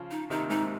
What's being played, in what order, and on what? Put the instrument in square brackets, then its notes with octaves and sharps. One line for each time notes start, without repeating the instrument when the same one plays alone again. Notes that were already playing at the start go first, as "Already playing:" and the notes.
Already playing: [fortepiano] C#3 F3
[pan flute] D#4
[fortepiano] C3 D#3 [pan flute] D#4
[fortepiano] G#2 C3 [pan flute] D#4